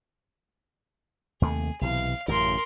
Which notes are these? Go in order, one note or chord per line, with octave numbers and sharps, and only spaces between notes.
D#2 C3 A3 G#4
B1 C3 E3 F5
A1 F#2 C#3 A#4 C6